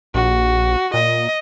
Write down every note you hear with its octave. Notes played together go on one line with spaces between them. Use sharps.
A#1 F#4
A#2 D#5